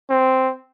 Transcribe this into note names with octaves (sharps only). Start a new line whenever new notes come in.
C4